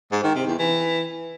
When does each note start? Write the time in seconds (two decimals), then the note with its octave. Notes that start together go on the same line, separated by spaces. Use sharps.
0.12 G#2
0.24 D#3
0.35 C3
0.47 E2
0.59 E3